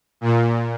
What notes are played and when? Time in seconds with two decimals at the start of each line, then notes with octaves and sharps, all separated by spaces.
0.21 A#2